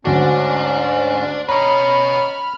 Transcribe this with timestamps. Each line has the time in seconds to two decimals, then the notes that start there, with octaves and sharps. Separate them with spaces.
0.05 D2 G#2 C#4 D4 F#4
1.49 C#4 B4 D#5 A#5 B5 F6